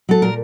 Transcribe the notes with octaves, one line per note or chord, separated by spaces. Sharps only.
F#3 A4
A#2 A#4